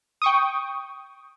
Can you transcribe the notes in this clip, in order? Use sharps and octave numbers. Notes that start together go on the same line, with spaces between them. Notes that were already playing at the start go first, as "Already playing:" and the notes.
G5 C#6 D#6